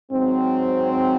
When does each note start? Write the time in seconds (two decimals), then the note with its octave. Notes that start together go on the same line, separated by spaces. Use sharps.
0.12 G#2 F#3 C4